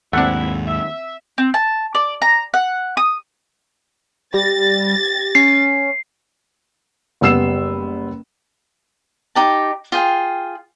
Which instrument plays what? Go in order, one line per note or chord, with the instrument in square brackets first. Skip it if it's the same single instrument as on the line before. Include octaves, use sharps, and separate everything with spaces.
[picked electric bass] D#2 G#2 [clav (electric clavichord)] A3 D4 [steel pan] C4 F#5 [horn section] E4
[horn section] E5
[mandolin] C4
A5
D5
A#5
F#5
D#6
[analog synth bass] G3 [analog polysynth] G4 A#6 [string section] A6
[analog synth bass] C#4 [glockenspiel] C7
[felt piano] F#1 G3 B3 E6 C7 E7
[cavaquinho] D#4 G4 A5
F4 G#4 G5